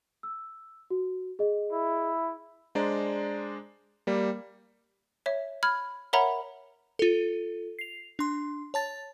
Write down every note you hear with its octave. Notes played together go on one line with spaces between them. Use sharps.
E6
F#4
G#4 D#5
E4
G#3 D4 C5 D5 A#5
G3 A#3
C#5 E5
B5 F6 G#6
A#4 C#5 E5 F#5 A#5 B5
F4 A4
C7 F7
D4 C6
C#5 A5 A6